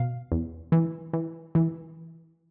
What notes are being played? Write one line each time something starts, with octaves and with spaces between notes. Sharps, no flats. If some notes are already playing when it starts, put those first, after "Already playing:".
Already playing: B2 F5
E2
E3
E3
E3